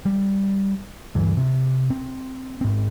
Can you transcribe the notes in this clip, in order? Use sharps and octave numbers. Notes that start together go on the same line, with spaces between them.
G3
D2 G2 E3
C3
C4
G#2 C4